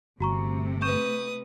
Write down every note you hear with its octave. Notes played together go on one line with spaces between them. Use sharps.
G1 C3 A3 F#4 A#5 C#6
B4 C#6 D#6 G6 E7